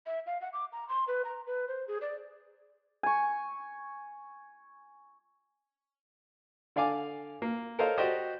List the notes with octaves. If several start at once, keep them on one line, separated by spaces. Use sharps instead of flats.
E5
F5
F#5
D6
A#5
C6
B4
A#5
B4
C5
G#4
D5
G#5 C#6
D3 D5 F5 G#5 D6
A#3
A4 A#4 C5 C#5 D#5 F5
F#4 G4 C5 D5 D#5